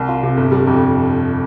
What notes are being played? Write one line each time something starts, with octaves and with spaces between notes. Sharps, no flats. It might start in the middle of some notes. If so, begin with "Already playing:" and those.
Already playing: C2
F4
C3
G1
G3
F2